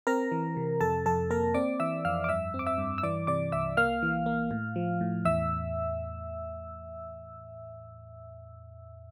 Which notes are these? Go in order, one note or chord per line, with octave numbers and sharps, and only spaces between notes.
C4 A#4 A#5
E3
C3
F2 A4 A5
F2 A4 A5
A#3 A#4 A#5
C4 D5 D6
E3 E5 E6
F2 F5 F6
D6
G2 E5 E6
C4
D6
E5 E6
G2
E6
E3 D5 D6
C3 D5 D6
C2 E5 E6
A#3 F5 F6
E3
A#3
A2
F3
A2
E2 E5 E6